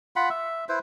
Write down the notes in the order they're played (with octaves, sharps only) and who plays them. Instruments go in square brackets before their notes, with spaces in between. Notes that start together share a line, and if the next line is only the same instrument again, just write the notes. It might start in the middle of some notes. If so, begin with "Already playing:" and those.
[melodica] F4 F#5 B5
E5
E4 B4 C5